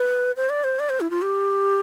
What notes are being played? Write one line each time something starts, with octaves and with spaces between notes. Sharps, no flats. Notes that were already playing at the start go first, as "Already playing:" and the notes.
Already playing: B4
C5
D5
C5
D5
C5
E4
F4
G4